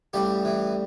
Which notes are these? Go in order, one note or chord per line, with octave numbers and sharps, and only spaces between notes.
A1 G3 G4
E3